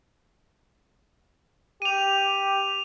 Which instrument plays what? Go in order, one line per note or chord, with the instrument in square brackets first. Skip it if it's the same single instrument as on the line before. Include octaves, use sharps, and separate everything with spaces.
[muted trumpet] G4 [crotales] D#7 F7